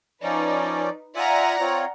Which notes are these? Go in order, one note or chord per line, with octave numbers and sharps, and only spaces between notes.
F3 C#4 D#4 B4 D5
F4 D5 E5 F#5 G#5 A#5
C4 F4 C#5